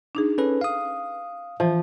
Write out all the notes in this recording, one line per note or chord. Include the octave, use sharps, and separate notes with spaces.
D4 D#4 G#4
C#4 A4 B4
F5 D#6
E3 F3